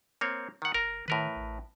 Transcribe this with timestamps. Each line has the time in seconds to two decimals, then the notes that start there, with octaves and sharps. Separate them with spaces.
0.21 A#3 C4 C#5
0.62 D#3 F#5
0.74 F#1 A#4 A#5
1.08 A2 D#3 A#4 B4
1.36 A1